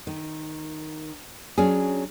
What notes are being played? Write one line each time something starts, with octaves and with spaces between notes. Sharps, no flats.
D#3
F#3 C#4 D4 G#4